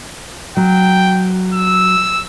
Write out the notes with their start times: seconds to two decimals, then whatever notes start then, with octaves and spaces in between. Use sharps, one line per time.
0.57 F#3 G5
1.54 E6